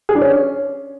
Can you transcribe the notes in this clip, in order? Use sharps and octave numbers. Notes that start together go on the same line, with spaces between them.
G#4
D4
C#4